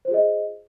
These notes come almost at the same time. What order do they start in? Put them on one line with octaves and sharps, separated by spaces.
C5 F4 G#4 D#5